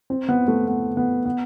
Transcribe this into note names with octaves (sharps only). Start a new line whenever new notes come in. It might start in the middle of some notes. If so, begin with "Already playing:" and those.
C4
B3
A3
B3
B3
B3